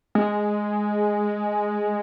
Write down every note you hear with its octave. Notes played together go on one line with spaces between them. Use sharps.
G#3